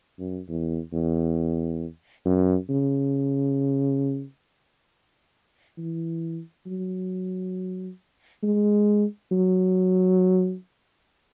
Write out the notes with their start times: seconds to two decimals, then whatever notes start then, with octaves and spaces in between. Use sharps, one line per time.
0.19 F#2
0.49 E2
0.93 E2
2.25 F#2
2.69 C#3
5.78 E3
6.67 F#3
8.43 G#3
9.31 F#3